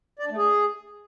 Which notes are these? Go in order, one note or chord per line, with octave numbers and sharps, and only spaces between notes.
D5
D4
A3
G#4